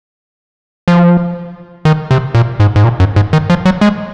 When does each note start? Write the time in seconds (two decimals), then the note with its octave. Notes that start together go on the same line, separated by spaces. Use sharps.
0.88 F3
1.85 D#3
2.11 C3
2.35 A#2
2.60 G#2
2.76 G#2
2.84 A#2
3.00 F#2
3.16 G#2
3.33 D#3
3.50 F3
3.65 F#3
3.81 G#3